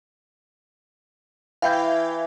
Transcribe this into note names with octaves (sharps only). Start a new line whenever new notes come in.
E3 E4 F5 G5 G6